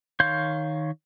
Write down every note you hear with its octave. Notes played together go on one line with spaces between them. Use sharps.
D#3 C#5 F5 C6 G6